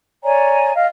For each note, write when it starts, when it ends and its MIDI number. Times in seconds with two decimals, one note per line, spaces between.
0.23 0.72 73
0.23 0.72 74
0.23 0.72 80
0.23 0.72 82
0.75 0.86 75
0.75 0.86 77